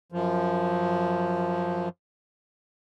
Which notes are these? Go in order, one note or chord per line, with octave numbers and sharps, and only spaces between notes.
F#2 F3